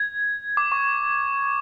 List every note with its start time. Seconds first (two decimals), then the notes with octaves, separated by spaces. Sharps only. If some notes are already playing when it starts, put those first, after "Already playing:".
Already playing: G#6
0.57 D6
0.72 C#6